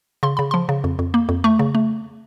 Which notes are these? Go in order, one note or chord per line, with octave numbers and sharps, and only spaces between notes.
C#3 C6
C#3 B5
F3 C6
C#3
F2
F2
A#3
F2
A3 C#6
C#3
A3